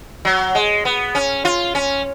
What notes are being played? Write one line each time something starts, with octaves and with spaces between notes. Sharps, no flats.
F#3
G#3
B3
C#4
F4
C#4